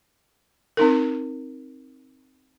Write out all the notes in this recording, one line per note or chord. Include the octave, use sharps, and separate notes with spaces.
C4 D#4 A#4